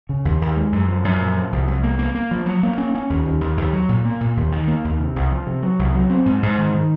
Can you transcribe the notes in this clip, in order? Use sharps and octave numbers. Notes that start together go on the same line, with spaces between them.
C#3
D#2
D#2
G#3
F#2
F3
F#2
A#2
F3
C2
C2
A#3
A#3
A#3
F3
F#3
A#3
C#4
C#4
D#2
D#2
D#2
D#2
F#3
A#2
A#3
A#2
D#2
D#3
A#3
D#2
C3
C2
F3
C3
F#3
C2
F#3
C4
G#2
G#2
D#3
D#3